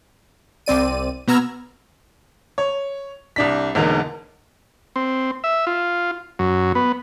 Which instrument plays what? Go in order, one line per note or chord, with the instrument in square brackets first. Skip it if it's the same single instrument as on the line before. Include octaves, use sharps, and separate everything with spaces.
[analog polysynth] C2 C4 D5 D#7
B2 B3 A#5 E6 F6 G#6
[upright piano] C#5
C2 D4 B6
E1 E2 D3 A#3 D#4
[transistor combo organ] C4
E5
F4
F#2
B3